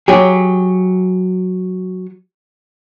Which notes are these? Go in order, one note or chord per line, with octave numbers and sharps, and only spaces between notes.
F#3 G4 G#4